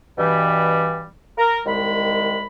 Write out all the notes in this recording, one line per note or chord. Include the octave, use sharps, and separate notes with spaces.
G2 B2 E3 G3
A#4
C2 D#3 G#3 B5